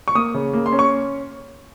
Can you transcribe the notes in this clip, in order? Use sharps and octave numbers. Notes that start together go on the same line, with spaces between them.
C#6
A#3 D#6
C#3
A#3
C6
C#4
C#6